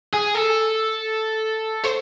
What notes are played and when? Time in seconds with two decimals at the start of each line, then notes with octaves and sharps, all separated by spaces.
0.14 G#4
0.35 A4
1.85 C5